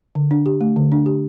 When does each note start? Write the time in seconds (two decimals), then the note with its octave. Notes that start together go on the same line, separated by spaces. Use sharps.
0.15 D3
0.31 D4
0.46 G4
0.61 A3
0.76 D3
0.92 D4
1.06 G4